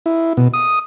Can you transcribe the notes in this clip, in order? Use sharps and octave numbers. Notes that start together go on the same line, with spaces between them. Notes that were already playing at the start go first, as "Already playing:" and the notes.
E4
B2
D#6